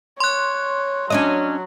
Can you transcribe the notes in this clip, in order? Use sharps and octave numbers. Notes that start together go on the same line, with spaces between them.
C#5 C6 F#6
F#3 C#4 D4 D#5